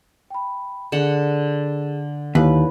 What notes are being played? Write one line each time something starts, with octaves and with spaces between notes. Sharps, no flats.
G5 B5
D3 D4 G#4 F#5 E7
D#2 E4 B4 C#5